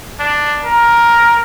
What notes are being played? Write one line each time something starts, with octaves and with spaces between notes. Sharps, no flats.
D4
A#4